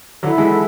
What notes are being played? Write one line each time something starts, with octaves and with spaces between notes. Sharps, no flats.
D3 F#3 E4 A4 E5
E3 G#3